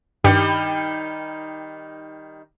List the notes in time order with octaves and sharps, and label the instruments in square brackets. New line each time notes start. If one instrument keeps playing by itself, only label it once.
[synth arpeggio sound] G2 G4 [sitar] D#3 G3 D#4